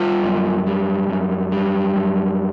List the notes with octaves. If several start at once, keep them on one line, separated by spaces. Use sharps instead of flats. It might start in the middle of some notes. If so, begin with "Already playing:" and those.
Already playing: G3 F4
F#2
G3
F#2
G3
F#2